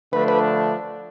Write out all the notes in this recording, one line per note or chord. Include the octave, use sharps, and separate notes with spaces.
D3 F3 A3 D4 B4
B4